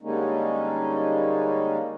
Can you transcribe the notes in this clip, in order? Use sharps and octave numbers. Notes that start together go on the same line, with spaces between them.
D3 G3 G#3 A#3 C#4 D#4